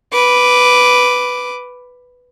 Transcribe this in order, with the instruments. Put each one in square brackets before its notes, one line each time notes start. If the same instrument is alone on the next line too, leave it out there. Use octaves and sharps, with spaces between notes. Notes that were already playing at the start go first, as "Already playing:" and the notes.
[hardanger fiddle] B4 D6